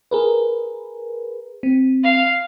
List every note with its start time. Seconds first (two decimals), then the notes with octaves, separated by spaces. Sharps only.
0.11 G#4 A#4 B4
1.63 C4
2.04 F5